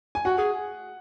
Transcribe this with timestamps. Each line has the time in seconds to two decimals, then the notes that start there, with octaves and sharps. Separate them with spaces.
0.15 G#5
0.25 F#4 F#5
0.38 G#4